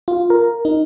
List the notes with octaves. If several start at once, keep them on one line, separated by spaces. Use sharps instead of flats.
F4
A#4
D#4